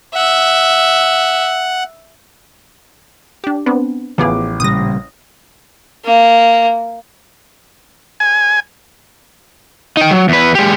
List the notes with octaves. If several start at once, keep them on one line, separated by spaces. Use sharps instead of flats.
E5 F#5
D4 G4
B3 C4 D4
A1 F3 B3 G#4 D6
A#2 C#3 G3 D#6 A#6
A#3
G#5
D#4 G5
F#3
E2 B4
G#3 G4